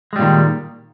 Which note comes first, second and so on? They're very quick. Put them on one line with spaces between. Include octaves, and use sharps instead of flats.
G#3 G3 A#2 D#3